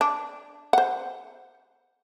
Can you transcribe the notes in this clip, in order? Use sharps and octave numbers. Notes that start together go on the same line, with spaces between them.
D4
C5 F#5